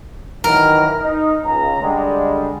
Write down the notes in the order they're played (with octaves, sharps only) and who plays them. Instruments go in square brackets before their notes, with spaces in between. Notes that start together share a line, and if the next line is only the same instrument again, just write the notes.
[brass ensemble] D#3 E3 F#3 [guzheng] A#4
[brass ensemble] D#4
C#2 A#5
D3 G3 G#3